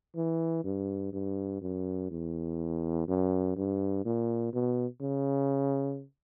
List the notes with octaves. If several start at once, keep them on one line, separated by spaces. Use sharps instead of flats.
E3
G2
G2
F#2
E2
F#2
G2
A#2
B2
C#3